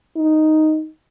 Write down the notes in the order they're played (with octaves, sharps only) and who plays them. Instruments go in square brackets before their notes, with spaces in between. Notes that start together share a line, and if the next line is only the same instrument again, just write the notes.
[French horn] D#4